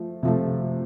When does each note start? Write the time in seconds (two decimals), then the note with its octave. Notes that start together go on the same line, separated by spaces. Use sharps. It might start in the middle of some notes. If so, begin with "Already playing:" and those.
Already playing: F3 A3
0.23 C3 F3 A3